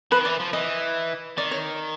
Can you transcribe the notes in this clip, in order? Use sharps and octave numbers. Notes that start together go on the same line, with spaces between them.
F3 B4
D#3
E3 D5
F3
E3 D#5
D#3 D5
C#5